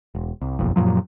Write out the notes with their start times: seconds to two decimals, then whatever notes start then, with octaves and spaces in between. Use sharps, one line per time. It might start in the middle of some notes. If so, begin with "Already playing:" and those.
0.15 E1
0.41 C2
0.59 F#1 B1 F2
0.76 F#2 A#2 F3 F#3